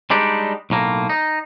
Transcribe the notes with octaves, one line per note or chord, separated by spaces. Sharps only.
G3 G#3 D4 D#4 G4
B1 A2 A#3
D#4